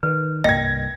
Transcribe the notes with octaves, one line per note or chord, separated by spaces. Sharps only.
D#3 B4
C2 G2 A#3 D#5 G5 G#6 A#6